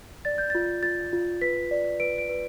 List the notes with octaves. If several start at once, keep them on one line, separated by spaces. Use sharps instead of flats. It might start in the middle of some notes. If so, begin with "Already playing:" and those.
D5 A6
G6
F4 A6
F4 A6
F4
B4 B6
D5
B4 D7
D7
B4